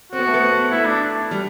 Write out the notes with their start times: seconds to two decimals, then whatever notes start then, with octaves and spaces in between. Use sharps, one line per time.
0.12 C4 F#4
0.19 B3
0.27 A3
0.34 B3
0.71 A3 E4
0.86 D4
1.31 G3